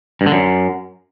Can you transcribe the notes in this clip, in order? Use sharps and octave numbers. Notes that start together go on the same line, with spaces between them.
G2
D3
F#2